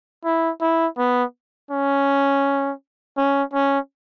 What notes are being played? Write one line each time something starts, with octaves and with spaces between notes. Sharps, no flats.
E4
E4
B3
C#4
C#4
C#4